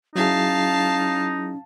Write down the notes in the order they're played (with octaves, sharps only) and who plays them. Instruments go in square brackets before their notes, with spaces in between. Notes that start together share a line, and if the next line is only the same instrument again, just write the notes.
[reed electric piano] F#3 E4 G#4 [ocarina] C#4 [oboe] D#4 [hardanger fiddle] F5 A5